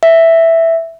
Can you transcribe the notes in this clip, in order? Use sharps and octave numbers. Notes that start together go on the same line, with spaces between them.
E5